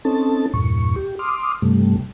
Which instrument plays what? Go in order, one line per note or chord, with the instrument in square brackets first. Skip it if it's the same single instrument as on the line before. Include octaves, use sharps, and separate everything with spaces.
[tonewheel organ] C4 C#4 D#4 A4 A5
E2 G2 A#2 C#6
G4
C6 D6 D#6 F6
G2 C3 G3 A3